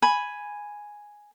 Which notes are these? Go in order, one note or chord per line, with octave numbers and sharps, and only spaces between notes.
G#5 B5